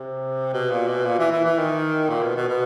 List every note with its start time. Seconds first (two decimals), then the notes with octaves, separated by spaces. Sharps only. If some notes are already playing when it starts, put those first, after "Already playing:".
Already playing: C3
0.53 B2
0.71 A#2
0.88 B2
1.05 A#2
1.19 E3
1.31 E3
1.44 E3
1.58 D#3
2.09 A#2
2.22 B2
2.36 B2
2.49 B2